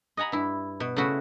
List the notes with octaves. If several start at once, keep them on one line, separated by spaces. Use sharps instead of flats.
D#5 F#5 G#5 A#5 B5
G2 E4
B2
C#3 A3 E4 F#4 B4 C5